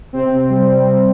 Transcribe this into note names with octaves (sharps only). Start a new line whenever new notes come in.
C3 C4
G3
C3